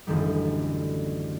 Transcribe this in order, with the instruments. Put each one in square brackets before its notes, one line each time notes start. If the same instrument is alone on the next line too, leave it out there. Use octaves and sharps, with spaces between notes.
[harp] A1 F#2 D3 D#3 G3